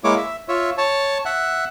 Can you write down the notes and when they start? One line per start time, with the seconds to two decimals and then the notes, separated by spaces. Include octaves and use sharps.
0.04 G#3 A#3 E4 C#5 D6
0.17 E5
0.48 F4 C#5 E5
0.78 C#5 A5
1.25 E5 F#5